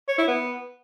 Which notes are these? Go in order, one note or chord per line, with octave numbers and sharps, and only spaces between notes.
C#5
E4
B3